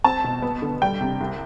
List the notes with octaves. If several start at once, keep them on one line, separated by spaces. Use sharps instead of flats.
C4 A5
B2
B3
D3
G3 G5
C3
C2